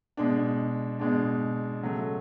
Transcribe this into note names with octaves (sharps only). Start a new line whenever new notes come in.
B2 G#3 D4
B2 G#3 D4
C#3 F#3 A3